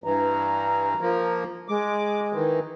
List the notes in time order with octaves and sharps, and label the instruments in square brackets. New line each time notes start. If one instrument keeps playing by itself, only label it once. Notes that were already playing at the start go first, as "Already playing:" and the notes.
[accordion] G2 E3 [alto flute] A#5
[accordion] F3 A#3
[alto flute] G#3 [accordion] D6
[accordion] D#3 E3